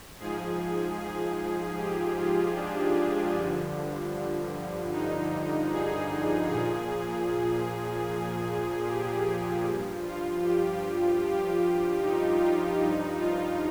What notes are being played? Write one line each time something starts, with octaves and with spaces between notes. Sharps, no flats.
G#2 F3 G#4
G#4
G4
F4
D4
G2 D3 F3
D#4
G#4
A#2 F3 G#4
G4
G#4
G2 F3
F4
G4
G4
D#4
F4
G2 F3 D#4
F4